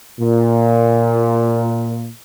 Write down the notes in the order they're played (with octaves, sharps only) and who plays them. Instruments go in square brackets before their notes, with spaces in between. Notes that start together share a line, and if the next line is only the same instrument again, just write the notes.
[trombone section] A#2